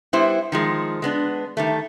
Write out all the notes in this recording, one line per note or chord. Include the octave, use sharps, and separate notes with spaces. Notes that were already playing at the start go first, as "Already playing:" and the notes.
G3 B3 E4 C5
D#3 F3 G#3
G#3 B3 D4
D#3 G3 A3